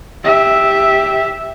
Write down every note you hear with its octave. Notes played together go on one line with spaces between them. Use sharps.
G4 E5